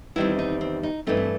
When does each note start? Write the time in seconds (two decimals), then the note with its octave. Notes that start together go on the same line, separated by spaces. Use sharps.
0.16 E2 D#3 G3 C4 E4
0.39 D#4
0.61 C4
0.83 D#4
1.07 G2 E3 A3 C4 D#4
1.17 C4